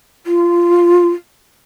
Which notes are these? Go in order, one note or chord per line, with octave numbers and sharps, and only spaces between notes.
F4